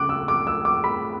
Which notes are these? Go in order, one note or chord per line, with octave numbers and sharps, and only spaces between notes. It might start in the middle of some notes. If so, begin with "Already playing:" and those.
Already playing: C#3 D6 F#6
E6
D6
E6
D6
B5